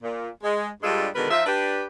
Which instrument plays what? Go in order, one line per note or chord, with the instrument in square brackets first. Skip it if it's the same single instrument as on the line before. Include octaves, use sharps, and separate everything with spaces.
[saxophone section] A#2
G#3
G2 G3 G#3 D4 F4 A4
B2 D3 D#3 G#3 A#4 B4
F3 D#4 F4 E5
D4 G4 B4